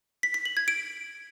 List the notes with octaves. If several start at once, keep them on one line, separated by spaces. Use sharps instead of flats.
B6
B6
F#7
G#6
D7